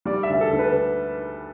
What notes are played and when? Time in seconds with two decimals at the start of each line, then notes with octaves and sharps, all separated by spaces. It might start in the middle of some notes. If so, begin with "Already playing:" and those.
0.05 G3 D5
0.23 E5
0.30 D2
0.41 A4
0.53 D2
0.59 B4